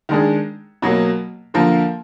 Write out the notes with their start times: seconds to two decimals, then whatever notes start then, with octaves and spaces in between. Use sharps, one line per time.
0.09 D#3 G#3 D4 G#4
0.82 B2 F#3 A#3
1.54 D3 F3 A#3 F4 A#4